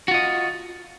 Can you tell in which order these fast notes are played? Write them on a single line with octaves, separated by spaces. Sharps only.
F#4 F4 D#5